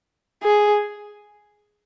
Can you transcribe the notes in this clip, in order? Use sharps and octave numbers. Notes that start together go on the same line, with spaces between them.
G#4